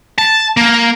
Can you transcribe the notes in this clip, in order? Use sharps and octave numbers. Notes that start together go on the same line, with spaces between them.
A5
A#3